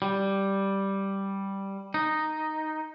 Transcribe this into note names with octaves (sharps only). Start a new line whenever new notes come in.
G3
D#4